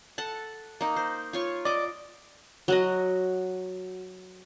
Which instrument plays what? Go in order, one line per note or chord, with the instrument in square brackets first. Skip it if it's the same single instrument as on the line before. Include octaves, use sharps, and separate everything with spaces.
[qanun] A4 F#5 A5
A#3 D#4
C5
F4 C#5 C#6
[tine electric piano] D5 [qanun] D#5 D6
[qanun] F#3 F#4 D#5